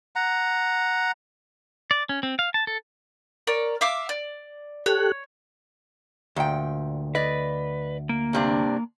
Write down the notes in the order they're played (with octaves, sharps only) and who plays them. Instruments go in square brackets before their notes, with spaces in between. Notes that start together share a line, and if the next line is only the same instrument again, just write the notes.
[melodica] F#5 A#5
[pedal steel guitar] D5
C#4
C4
F5
A5
A4
[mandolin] A#4 C#5 D5
E5 F5 D6
D5
[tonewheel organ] G4 A4 F#6 [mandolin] C#5
[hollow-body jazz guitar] D2 [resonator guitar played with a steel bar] A#2 G5
[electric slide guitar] B4 [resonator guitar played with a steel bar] D5 D#5
[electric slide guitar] A#3
[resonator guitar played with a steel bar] G2 C3 D4